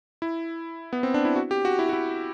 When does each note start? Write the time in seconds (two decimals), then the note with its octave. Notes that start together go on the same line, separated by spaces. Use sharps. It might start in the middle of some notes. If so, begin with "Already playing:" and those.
0.22 E4
0.93 B3
1.03 C4
1.14 D4
1.25 E4
1.36 F#4
1.51 G4
1.65 F#4
1.79 E4
1.89 F#4
1.93 E4